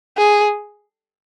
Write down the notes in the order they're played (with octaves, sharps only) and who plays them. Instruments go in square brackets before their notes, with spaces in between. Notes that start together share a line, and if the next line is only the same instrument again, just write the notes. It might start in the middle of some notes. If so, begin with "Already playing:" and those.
[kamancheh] G#4